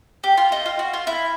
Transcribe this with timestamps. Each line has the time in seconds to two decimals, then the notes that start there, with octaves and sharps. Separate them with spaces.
0.24 G4
0.37 F4
0.52 D#4
0.66 F4
0.79 F#4
0.93 F4
1.07 E4